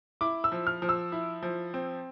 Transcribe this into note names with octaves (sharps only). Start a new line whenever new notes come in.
E4 D6
E6
F3
F6
F3
E6
E4
F3
C4